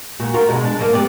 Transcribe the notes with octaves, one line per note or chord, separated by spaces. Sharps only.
A#2 F#4
F4 F#4 A#4
B2 G#3
D4
F#3 A#3
B3 G4 D5